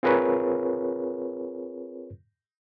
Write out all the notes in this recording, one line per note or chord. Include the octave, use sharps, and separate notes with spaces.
C4 F4 G#4 A#4 B4 C#5